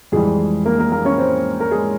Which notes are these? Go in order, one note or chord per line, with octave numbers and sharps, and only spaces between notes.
F2 E3 G3 G#3 G#4
A#3 A#4
A#3 A#4
A#3 A#4
C#4 C#5
C4 C5
A#4
G#3 G#4